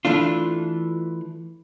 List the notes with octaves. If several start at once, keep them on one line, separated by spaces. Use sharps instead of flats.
E3 A3 D4 F4